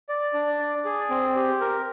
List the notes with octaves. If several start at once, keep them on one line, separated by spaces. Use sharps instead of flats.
D5
D4
D5
G#4
C4
G4
A#4